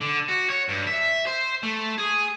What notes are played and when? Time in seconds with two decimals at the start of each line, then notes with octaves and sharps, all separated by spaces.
0.01 D3
0.28 F#4
0.50 C#5
0.68 G2
0.87 E5
1.27 C5
1.63 A3
1.98 G#4